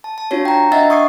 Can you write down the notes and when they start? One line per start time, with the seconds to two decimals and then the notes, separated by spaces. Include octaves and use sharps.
0.04 A5
0.18 A5
0.31 D4 F4 F#4 C#5
0.45 G5 A#5
0.72 D4 D#5 E5 F#5 A6
0.90 C#6 D#6 G#6 C7